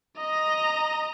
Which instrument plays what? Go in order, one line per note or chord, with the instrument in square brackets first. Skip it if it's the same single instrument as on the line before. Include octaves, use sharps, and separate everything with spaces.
[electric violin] D#5 A#5